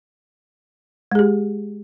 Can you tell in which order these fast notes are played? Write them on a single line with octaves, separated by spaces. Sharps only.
G#3 G#4 G4